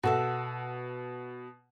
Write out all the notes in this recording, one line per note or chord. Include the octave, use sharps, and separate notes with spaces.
B2 F#4 A4 E5